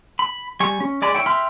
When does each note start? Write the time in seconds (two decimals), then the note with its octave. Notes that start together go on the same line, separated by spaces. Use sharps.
0.19 B5
0.60 G3 G#5 C#6
0.80 C#4
1.02 G#3 D5 G#5 B5
1.15 E4 C#5 G5
1.26 E5 G5 B5 C6 F6